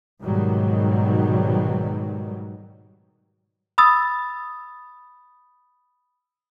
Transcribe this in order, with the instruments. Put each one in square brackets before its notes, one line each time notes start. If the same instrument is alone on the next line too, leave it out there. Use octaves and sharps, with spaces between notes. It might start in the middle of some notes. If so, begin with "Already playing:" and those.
[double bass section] G#2 B2 D#3 F#3 G3
[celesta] B5 D#6 E6 A6